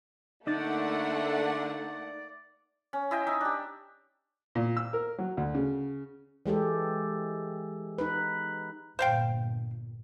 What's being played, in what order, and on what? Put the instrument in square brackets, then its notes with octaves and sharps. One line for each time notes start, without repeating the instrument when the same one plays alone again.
[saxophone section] D3 [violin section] A3 A#3 F#5 [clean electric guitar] D#4 [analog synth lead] D5
[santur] C#4
E4 D#5 G5
D#4 E5
D4 G4
[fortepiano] A#2
E6
A#4
F#3
D2
C#3
[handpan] E3 G#3 G4 A4
D#4 B4
[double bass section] G1 A#2 [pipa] C5 F5 G5